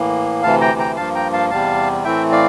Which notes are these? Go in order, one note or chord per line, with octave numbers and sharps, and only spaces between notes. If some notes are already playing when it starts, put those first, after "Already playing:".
Already playing: A2 E3 A#3
D2 C3 E3 F5 A5
G5 A#5
G5 A#5
G2 F3 A#3 F5 A5
G5 A#5
F5 A5
E2 C3 G3 F5 A5
A2 E3 A3 C4 E5 G5
D5 F5